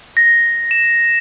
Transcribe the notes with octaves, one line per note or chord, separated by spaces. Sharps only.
A#6
E7